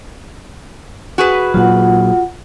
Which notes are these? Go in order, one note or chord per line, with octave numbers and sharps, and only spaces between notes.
F#4 G#4 B4
A#2 F#3 F4 F#5